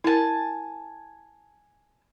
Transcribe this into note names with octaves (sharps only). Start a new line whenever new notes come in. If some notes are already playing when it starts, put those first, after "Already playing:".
E4 A#4 G#5 A5